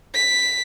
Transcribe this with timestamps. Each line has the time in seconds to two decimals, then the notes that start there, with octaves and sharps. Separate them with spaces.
0.15 B6